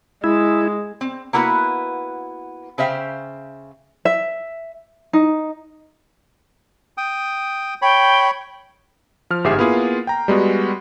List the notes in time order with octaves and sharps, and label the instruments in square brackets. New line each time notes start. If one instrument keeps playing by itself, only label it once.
[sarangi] G#3 [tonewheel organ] E4
[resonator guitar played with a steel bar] C4
A#3 B3 E4 F#4 B4
C#3 C5 E5 F5 G5
[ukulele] E5
D#4
[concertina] G5 D#6
[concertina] C#5 B5 [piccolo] G5
[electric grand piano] F3 F6
G1 G#2 G4 G#4 E5 C7
A#3 B3 E4 F4 G#4
G5 A#5
G3 G#3 B3 F#4